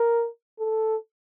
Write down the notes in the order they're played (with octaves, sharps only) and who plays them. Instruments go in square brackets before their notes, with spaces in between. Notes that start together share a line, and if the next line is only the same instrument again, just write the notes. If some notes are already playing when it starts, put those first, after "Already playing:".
Already playing: [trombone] A#4
A4